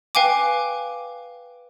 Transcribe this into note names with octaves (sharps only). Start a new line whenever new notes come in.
B4 F5 G5 G#5 D6